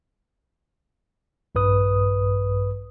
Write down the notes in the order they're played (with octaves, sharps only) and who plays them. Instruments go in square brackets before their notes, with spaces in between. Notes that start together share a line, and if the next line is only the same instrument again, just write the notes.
[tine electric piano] A#1 G2 B4 D#6